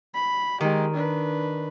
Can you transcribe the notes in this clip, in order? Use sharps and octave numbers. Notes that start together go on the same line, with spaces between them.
B5
D#3 G#3 G4
D4 B4